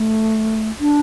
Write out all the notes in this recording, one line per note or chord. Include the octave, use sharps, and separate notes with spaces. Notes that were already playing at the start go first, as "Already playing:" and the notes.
Already playing: A3
D4